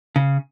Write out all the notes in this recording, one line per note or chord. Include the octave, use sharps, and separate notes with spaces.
C#3